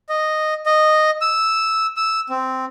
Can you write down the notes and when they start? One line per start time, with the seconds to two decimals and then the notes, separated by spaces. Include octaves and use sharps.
0.09 D#5
0.66 D#5
1.21 E6
1.97 E6
2.29 C4